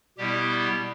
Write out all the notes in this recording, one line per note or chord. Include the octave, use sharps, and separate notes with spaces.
B2 G3 B3 E4 G4